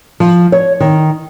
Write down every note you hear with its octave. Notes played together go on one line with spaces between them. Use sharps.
F3
C#5
D#3